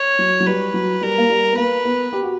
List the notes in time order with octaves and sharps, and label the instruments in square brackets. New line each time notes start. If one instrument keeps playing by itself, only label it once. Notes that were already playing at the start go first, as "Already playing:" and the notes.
Already playing: [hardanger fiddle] C#5
[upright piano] F#3
F#3
[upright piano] G3 [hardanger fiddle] B4
[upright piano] F#3
[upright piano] G3 [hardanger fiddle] A#4
[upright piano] A#3
G3
B3
[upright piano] A#3 [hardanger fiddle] B4
[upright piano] B3
G4
F#4